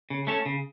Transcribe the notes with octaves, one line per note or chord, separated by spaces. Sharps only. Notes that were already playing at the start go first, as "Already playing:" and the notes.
C#3
A3 C#4 A4 C#5
C#3